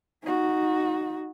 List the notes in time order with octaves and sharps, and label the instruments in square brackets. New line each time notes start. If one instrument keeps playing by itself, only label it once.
[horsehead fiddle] D#4 F#4